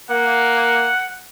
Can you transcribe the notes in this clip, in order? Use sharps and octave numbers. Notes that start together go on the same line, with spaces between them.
A#3 F#5